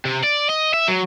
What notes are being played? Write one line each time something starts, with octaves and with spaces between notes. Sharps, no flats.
C3
D5
D#5
E5
F#3